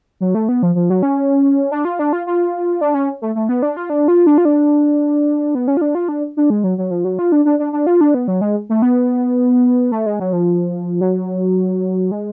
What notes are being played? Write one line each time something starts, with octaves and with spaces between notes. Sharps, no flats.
F#3
A3
B3
F3
F3
F#3
C#4
D4
F4
D4
F4
F4
D4
C#4
A3
A3
B3
D4
F4
D4
F4
D4
F4
D4
B3
C#4
F4
D4
F4
D4
D4
G#3
F#3
F#3
F3
F#3
F4
D4
D4
D4
D4
F4
D4
B3
F#3
G#3
A3
B3
A3
G#3
F#3
F3
F#3
G#3